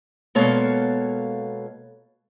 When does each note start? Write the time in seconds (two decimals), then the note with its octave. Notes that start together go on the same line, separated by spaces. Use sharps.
0.35 B2 G#3 A#3 A4 C#5 F5